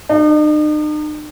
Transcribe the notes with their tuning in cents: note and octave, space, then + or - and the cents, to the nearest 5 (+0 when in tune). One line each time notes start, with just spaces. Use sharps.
D#4 -45